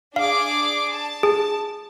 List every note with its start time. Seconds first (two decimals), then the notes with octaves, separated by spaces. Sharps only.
0.16 D4 G#4 F5 D6
0.92 A5
1.23 G#4